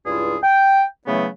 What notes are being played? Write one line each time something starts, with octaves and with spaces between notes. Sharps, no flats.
C#2 G2 E4 F4 G#4
G5
C#3 E3 F#3 A3 B3